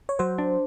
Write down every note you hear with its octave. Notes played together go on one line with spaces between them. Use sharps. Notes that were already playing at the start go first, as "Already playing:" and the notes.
C#5
F#3 C5
D4